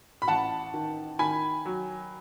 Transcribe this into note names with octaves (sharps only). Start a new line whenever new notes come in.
B5
A1 F#5 A5
D#3
D#3 G#5 B5
F#3